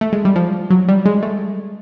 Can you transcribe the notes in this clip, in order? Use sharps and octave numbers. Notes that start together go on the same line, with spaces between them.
A3
G#3
G3
F3
F#3
G3
G#3
A3